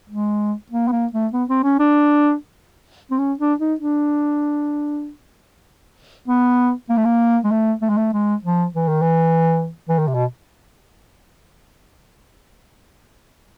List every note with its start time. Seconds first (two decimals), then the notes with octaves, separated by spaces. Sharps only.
0.10 G#3
0.72 A#3
0.88 B3
0.92 A#3
1.13 A3
1.33 B3
1.49 C4
1.64 C#4
1.79 D4
3.11 C4
3.19 C#4
3.39 D4
3.60 D#4
3.80 D4
6.28 B3
6.89 A#3
6.97 A3
7.05 A#3
7.44 G#3
7.51 A3
7.82 A3
7.90 G#3
7.97 A3
8.13 G#3
8.44 F3
8.74 E3
8.89 D#3
9.02 E3
9.89 E3
9.99 D#3
10.08 C3
10.14 B2